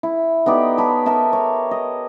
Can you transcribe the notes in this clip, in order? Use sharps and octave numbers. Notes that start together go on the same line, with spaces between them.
E4
B3 D#4 G4 D5
C#5 A5 B5
A#4 D#5 E5 A5
C#5
D#5